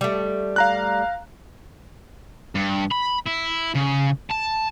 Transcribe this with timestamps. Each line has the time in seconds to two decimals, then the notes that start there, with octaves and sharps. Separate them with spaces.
0.01 G3 A3
0.56 F5 A#5 F#6
2.55 G2
2.92 B5
3.27 E4
3.75 C#3
4.30 A5